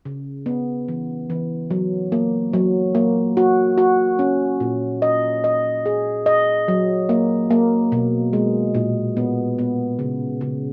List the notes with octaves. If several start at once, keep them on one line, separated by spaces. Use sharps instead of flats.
C#3
B3
E3
E3
F#3
A#3
F#3
A#3
F#4
F#4
C#4
A#2
D#5
D#5
G#4
D#5
F#3
A#3
A#3
B2
G#3
A#2
B3
B3
C#3
C#3